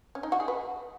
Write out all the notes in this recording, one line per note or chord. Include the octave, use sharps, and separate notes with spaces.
C#4
D#4
F#4
G#4
B4